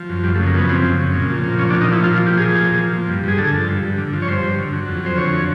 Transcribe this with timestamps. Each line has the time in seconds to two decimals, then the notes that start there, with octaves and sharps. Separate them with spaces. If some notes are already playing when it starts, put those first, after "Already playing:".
Already playing: F3
0.09 F#2
0.24 F#2 G3
0.35 A3
0.40 C#3
0.47 A#3
0.54 F3 B3
0.69 F#2 C4
0.84 F#2
0.99 C#3
1.14 A#2
1.29 F3
1.44 A#2
1.59 F3 C#4
1.70 D4
1.74 A#2
1.81 D#4
1.89 F3 E4
2.04 A#2 F4
2.19 F3
2.27 G4
2.33 A#2 G#4
2.48 F3
2.64 A#2
2.79 F3
2.93 F3
3.09 G2
3.23 G2 G#4
3.38 D3 A4
3.53 F3
3.68 G2
3.83 G2
3.98 D3
4.13 F3
4.22 C#5
4.28 G2 C5
4.43 G2
4.58 D3
4.73 F#3
4.88 F2
5.03 F2 C5
5.17 D3 C#5
5.32 F#3